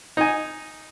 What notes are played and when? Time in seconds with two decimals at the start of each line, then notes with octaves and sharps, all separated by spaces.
0.17 D#4 G#5